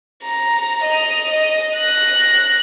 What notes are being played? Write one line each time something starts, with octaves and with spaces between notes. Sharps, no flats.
A#5
D#5 F7
D#5
F#6 A#6